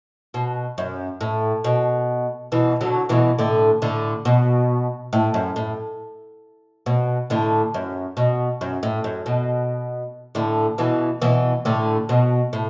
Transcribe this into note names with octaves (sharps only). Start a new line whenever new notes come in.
B2
F#2
A2
B2
B2 E3
D3 F#3
B2 E3
A2 D3
A2 D3
B2
A2
F#2
A2
B2
A2 D3
F#2
B2
F#2
A2
F#2
B2
A2 D3
B2 E3
B2 E3
A2 D3
B2
A2